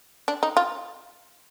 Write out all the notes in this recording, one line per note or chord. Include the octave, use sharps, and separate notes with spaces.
D4
D#4
F4